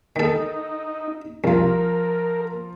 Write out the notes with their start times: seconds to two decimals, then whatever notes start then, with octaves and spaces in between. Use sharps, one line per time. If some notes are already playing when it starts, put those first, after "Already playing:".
0.16 D#3 D#4 A4
1.44 C2 F3 F4 A#4